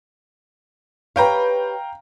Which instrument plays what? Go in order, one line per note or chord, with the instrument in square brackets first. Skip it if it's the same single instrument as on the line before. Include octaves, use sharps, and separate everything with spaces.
[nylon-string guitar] G4 B4 C#5 [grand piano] F5 G5 A#5